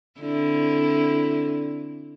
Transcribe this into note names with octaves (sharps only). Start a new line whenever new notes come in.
D3 C4 E4